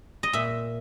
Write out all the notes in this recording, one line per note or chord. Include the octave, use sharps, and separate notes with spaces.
D#5
A#2 E5